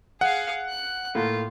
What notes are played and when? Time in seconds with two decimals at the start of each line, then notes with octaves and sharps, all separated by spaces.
0.21 G#4 F5 F#5
0.69 F#6
1.15 A2 A3 A#3 F4